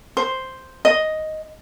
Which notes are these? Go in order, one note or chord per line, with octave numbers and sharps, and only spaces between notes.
C5
D#5